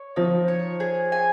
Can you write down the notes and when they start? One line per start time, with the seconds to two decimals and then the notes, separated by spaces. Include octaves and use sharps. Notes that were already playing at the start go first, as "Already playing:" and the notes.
Already playing: C#5
0.16 F3 D#4
0.48 C#5
0.80 G#4
1.12 G#5